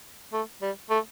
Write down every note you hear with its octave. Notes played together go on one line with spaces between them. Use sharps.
A3
G3
A3